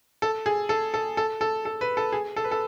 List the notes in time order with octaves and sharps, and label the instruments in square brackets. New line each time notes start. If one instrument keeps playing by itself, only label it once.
[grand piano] A4
G#4
A4
A4
A4
A4
A4
B4
A4
G#4
A4
B4
A4